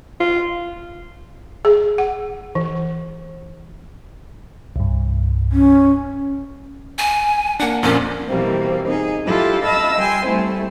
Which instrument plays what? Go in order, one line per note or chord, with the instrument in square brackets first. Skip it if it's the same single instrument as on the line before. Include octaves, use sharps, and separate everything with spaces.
[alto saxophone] F4
[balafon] G#4
F#5
E3
[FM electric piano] C2 G2
[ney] C#4
[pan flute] G#5
[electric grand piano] A#3 D4 [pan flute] F#5
[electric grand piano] F2 A#2 A#3 [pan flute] C#4
[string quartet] B2 E3 G3 A#3 C4
D#4 G#4
D4 E4 F4 G4 A4
D#5 F5 A5 B5 E6
G3 G5 G#5 C6
G3 A3 C4 E4